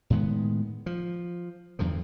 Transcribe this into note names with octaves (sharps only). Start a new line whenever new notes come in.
A2 D#3 G#3 B3
F3
E2 G2 D3 F3